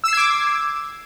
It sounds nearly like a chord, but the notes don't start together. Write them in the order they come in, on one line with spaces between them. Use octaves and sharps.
E6 C7 G#6 D6